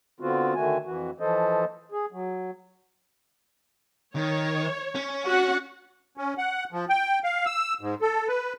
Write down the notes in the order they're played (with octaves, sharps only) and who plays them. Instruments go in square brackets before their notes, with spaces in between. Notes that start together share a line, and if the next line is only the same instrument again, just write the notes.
[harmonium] D3 B3 C4 F4 F#4
D3 D#3 A3 F#4 G#5
F2 E3 F#4
E3 F3 A4 C5 D#5
G#4
F#3
[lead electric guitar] D#3 [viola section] C#5
[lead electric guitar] C#4
[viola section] F#4 F#5
[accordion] C#4
F#5
F3
G5
F5
E6
G#2
A4
B4